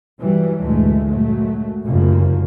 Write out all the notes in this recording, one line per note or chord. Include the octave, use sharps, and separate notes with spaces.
E3 F#3 G3
D2 G2 A#2 E3 G#3 A3
A#2 F#3 G#3 A3
F1 C2 F#2 C#3 F3 A#3